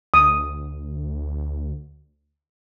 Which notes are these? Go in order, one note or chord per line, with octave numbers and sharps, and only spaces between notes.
D2 D#6